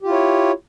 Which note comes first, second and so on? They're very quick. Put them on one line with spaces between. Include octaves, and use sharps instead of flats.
G4 F4 E4 C#5